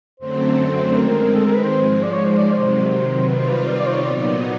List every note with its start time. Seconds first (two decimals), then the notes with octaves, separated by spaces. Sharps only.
0.19 F#2 D3 F#3 A3 C4 C5
0.97 D#3 G#3 C4 A#4
1.35 A4
1.45 A#4
1.55 B4
1.64 C5
1.74 G#2 F3 G#3
2.03 D5
2.12 C#5
2.25 C5
2.38 D5
2.51 C3 D#3 F#3 C5
3.28 C3 D#3 G3 C4 F4 B4
3.38 C5
3.48 B4
3.67 D5
3.79 D5
3.86 C5
3.93 C#5
4.05 A#2 F#3 B3 D#4 D5